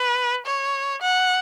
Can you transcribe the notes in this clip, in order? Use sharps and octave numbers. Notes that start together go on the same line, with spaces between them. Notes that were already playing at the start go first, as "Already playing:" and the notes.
Already playing: B4
C#5
F#5